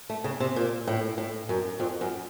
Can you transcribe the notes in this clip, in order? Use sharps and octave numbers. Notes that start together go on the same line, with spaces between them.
A3
C#3
C3
A#2
A2
A2
F#2
F2
F#2